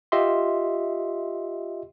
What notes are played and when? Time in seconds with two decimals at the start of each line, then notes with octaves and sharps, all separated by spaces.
0.12 F4 G4 D#5 E5 C6